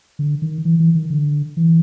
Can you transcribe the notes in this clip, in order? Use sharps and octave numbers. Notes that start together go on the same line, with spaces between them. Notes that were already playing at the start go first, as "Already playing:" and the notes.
D3
D#3
E3
E3
D#3
D3
E3